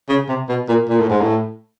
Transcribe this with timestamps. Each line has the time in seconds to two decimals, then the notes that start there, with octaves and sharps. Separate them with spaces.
0.09 C#3
0.29 C3
0.49 B2
0.69 A#2
0.89 A#2
0.99 A2
1.10 G#2
1.21 A2